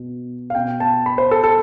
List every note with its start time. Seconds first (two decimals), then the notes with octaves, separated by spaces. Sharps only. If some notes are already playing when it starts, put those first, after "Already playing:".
Already playing: B2
0.50 F5
0.55 B2 G5
0.80 A5
1.06 B5
1.18 C5
1.31 A4
1.44 A4